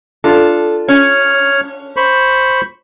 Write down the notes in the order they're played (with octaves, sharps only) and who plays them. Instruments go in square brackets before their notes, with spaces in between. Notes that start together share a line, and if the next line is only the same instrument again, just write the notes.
[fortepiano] D4 F4 [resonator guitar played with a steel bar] A4
[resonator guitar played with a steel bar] C#4 [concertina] C#5 F6
[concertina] C5 B5 C#6